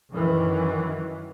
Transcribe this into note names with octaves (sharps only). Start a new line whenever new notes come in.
F#2 D#3 E3